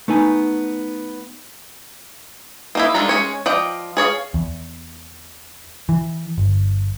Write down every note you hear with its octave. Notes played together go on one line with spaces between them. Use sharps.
A3 B3 D#4 G#5
A#3 D#4 E4
D#3 G#3 D4 F4 A#5
G#3 C#4 C#5
F3 D5 D#5 G5
G#4 C#5 D5 F5
E2
E3
G1